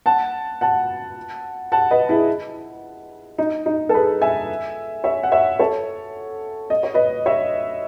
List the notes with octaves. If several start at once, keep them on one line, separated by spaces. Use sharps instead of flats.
F#5 A5
F#5 A5
F#5 A5
B4 D#5
E4 G#4
D#4
D#4
A4
G#4 B4
E5 G#5
C#5 E5
F#5
C#5 E5
A4 C#5
D#5
C#5
B4 D#5
C#5 E5